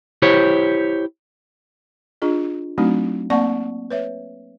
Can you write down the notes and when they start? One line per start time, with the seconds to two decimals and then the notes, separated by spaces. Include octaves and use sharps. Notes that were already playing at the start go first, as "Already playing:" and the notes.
0.22 E4 G4 C5 C#5
2.22 D4 F4 G#4 D#5
2.78 F#3 A3 C4 D4 D#4 F#4
3.30 A#3 C4 D5 F#5 A5 C#6
3.91 B4 C#5 E5